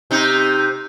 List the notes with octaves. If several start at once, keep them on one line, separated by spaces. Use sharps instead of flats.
C3 D#4